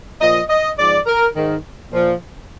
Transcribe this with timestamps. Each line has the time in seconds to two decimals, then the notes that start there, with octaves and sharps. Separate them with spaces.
0.21 A#2 F3 D#5
0.49 D#5
0.78 G#2 F3 D5
1.06 A#4
1.35 G#2 D#3
1.92 A#2 F3